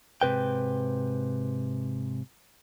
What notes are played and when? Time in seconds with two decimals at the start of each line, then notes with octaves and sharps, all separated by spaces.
0.21 G#2 C3 B4 G5